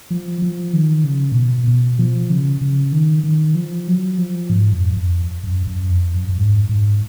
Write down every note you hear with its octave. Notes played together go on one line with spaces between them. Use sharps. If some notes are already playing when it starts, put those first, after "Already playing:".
F3
F3
D#3
C#3
A#2
B2
B2
F3
C#3
C#3
D#3
D#3
F3
F#3
F3
G#2
F2
F2
F#2
F#2
F2
F#2
F#2
G#2
G#2